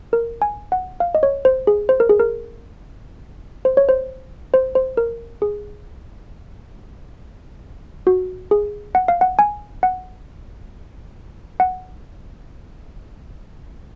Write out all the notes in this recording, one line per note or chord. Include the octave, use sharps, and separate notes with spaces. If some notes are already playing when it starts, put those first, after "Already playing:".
A#4
G#5
F#5
F5
D#5
C#5
C5
G#4
C5
A#4
G#4
A#4
C5
C#5
C5
C5
C5
A#4
G#4
F#4
G#4
F#5
F5
F#5
G#5
F#5
F#5